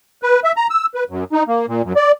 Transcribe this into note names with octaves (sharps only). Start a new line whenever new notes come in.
B4
E5
A#5
E6
B4
F#2
D#4
A#3
A#2
F#2
D5